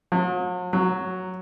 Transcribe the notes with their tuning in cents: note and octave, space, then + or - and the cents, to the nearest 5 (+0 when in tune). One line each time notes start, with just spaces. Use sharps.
F#3 -45
F#3 +0